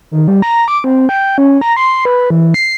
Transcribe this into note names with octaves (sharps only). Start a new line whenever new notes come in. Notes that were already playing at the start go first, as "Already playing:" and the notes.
D#3
G3
A#5
D6
C4
G5
C#4
A#5
C6
B4
E3
C7